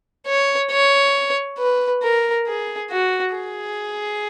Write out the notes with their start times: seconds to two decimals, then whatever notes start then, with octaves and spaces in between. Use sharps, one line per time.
0.26 C#5
0.71 C#5
1.58 B4
2.02 A#4
2.47 G#4
2.91 F#4
3.35 G#4